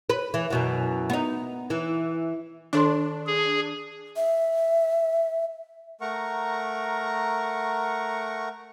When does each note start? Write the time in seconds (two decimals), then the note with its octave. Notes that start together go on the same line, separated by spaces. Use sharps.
0.10 B4
0.34 E3
0.50 F#2 B2 E3
1.10 B3 D#4
1.70 E3
2.73 D#3 D4 A4 C6
3.27 G#4
4.16 E5
6.01 A3 A#4 F#5 A#5 C#6